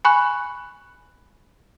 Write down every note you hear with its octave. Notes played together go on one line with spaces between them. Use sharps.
G#5 B5 C#6 F#6